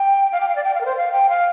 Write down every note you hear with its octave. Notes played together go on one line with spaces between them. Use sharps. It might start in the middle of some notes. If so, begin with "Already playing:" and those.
Already playing: G5
F5
G5
F5
D5
G5
F5
A#4
C5
F5
G5
F5